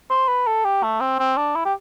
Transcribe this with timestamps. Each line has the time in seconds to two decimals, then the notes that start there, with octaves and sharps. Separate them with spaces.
0.10 C5
0.28 B4
0.47 A4
0.64 G4
0.83 A3
1.00 C4
1.19 C4
1.37 D4
1.55 E4
1.65 G4